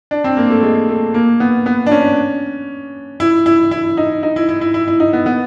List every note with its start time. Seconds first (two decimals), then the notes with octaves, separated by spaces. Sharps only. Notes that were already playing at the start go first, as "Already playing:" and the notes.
0.11 D4
0.24 C4
0.37 A#3
0.50 A3
0.63 G#3
0.89 A3
1.14 A#3
1.40 B3
1.66 B3
1.86 D4
1.91 C#4
3.20 E4
3.46 E4
3.71 E4
3.97 D#4
4.23 D#4
4.36 E4
4.49 E4
4.61 E4
4.74 E4
4.88 E4
5.00 D#4
5.13 B3
5.26 B3